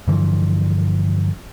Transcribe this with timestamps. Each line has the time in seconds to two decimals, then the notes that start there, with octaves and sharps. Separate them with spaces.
0.08 G2 D3 E3 F3